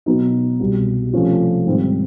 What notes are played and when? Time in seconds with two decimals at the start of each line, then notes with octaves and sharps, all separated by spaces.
0.06 B2 F#3 B3 D#4
0.60 C2 B2 G3
1.13 C3 F3 A3 C#4 F4
1.66 G#2 D#3 G3 C4